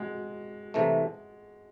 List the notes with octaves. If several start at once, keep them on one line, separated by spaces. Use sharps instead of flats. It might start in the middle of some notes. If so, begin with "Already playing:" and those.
Already playing: G#3 F#4
C2 C3 E3 A3